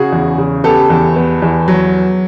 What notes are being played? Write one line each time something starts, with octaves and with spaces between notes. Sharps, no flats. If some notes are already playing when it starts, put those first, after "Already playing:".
Already playing: C#3 F#4 G#4
E2
C#3
B3 G4 A4
E2
B3
E2
F#3